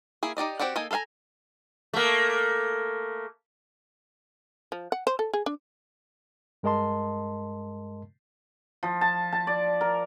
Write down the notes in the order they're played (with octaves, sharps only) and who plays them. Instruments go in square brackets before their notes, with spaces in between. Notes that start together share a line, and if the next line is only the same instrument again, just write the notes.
[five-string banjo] A#3 E4 G#4
D#4 G4 D5 D#5
C4 F#4 G4 D5 F#5
A#3 D#4 A4 G#5
A4 B4 F5 G#5 A#5
[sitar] A3 A#3
[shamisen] F3
F#5
C5
A4
G#4
D4
[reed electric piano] G2 G#3 A#4 D#5 A5 C6
[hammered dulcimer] F3
A5
A5
D5
A#4